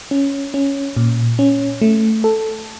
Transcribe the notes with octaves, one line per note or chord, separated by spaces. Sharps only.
C#4
C#4
A#2
C#4
A3
A4